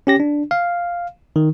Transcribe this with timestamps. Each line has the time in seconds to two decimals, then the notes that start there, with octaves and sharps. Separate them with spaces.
0.07 C#4 G4 A#6
0.20 D4
0.51 F5
1.36 D#3